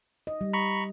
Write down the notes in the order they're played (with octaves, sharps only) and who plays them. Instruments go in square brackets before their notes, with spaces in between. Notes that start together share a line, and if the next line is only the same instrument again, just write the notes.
[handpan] D#5
G3
[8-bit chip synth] A#5 B5 C#6